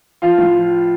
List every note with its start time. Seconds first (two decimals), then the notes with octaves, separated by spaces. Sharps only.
0.22 F3 F4 F5
0.38 A2
0.55 F3